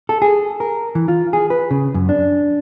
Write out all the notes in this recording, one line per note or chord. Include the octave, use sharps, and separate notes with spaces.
A4
G#4
A#4
E3
F4
G#4
B4
C#3
F#2
D4